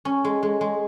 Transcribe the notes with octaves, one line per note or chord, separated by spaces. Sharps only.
C#4
G#3
G#3
G#3